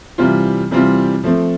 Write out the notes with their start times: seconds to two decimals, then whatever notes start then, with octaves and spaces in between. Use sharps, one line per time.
0.18 C3 E3 G3 C4 F4
0.71 C3 E3 G3 C4 F4
1.24 F3 A3 C4